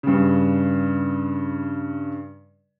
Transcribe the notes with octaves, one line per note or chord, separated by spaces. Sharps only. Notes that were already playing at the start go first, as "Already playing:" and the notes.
G2 C#3